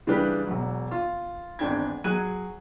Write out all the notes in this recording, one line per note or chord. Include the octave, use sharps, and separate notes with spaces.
C#3 E3 G3 D4 G4 B4
E1 F#3
F4
G#1 E2 D4 G5 G#6
F#3 G#4 F#6 G#6 D#7